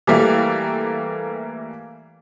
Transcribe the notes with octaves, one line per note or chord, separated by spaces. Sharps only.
E3 G3 A3 A#3